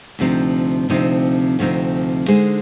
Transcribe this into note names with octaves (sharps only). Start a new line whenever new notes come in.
D2 C3 F3 C4 D#4
D2 C3 F3 C4 D#4
D2 C3 F3 C4 D#4
D3 G#3 D#4 G#4 C5